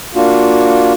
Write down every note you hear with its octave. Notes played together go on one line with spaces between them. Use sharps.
A#3 D4 F4 F#4